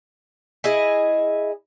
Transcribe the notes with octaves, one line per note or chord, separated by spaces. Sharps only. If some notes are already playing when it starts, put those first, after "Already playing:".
E4 G#4 D#5